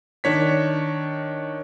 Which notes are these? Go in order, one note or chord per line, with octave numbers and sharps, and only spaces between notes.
D#3 D4 C#5 B6